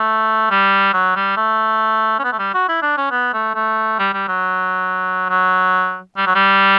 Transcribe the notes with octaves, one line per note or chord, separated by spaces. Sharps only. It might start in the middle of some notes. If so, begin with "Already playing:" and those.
Already playing: A3
G3
F#3
G3
A3
C#4
B3
A3
G3
F#4
E4
D4
C#4
B3
A3
A3
G3
G3
F#3
F#3
G3
F#3
G3